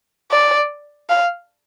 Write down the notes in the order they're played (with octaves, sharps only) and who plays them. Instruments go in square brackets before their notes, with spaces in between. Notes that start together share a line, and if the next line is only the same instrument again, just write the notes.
[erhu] D5
F5